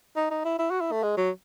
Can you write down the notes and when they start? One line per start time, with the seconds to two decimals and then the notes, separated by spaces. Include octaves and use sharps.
0.16 D#4
0.30 D#4
0.45 E4
0.59 E4
0.70 F#4
0.81 E4
0.91 A3
1.03 G#3
1.17 F#3